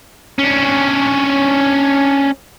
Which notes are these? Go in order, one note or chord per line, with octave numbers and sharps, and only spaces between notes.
C#4 D4